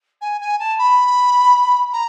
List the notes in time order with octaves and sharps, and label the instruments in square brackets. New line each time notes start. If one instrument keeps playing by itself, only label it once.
[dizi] G#5
G#5
A5
B5
A#5